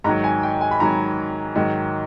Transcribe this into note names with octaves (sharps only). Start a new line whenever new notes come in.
G#2 D#3 F#3 A#5
G#5
G5
G#5
B5
G#2 D#3 F#3 A#5
G#2 D#3 F#3